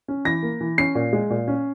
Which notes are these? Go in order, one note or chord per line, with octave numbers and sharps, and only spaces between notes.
C#4
E3 A#6
A#3
E3
C#4 C7
A#2
G#3
A#2
C#4